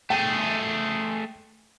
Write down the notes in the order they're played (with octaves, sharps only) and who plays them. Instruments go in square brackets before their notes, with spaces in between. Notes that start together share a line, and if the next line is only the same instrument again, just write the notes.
[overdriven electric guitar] A3 G#4 [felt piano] G5